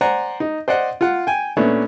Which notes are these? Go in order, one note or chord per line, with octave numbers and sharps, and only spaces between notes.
C5 D5 F#5 G#5 A#5
D#4
C5 D5 D#5 F#5
F4 F#5
G5 G#5
A#2 A3 B3 C#4 D4